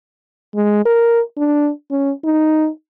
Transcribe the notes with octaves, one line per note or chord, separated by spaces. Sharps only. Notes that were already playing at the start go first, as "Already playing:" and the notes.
G#3
A#4
D4
C#4
D#4